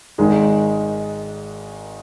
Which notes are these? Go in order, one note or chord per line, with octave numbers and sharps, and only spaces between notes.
G#1 G#2 D#3 G#3 D#4